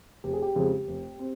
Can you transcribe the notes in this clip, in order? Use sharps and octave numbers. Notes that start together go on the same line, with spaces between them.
F1 G4
G#4
G4
F2 C#3 G#3 C4
F1
C4